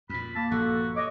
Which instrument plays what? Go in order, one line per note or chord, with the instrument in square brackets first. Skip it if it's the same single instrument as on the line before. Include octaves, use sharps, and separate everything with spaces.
[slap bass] F2 A#2 [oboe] B5
[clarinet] A#3 [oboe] A5
[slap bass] A#1 G2 [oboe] F#4 [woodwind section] A4
[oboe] C#5 [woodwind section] D#5 [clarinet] D6